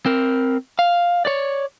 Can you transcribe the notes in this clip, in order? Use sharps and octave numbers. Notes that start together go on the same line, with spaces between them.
C4 A#4
F5
C#5 D5